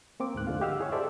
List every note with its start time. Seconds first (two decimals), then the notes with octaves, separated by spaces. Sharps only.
0.20 A#3 C4 D6
0.34 D2 G#2 F#6
0.47 F2 D3 G#3 A3 F4 F5
0.61 G4 D#5 F5 F#5 E6 F6
0.79 E4 G#4 C#5
0.92 G4 A4 C5 D5 E5